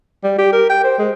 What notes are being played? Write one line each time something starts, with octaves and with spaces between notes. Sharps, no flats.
G3
G4
A#4
G5
C5
G#3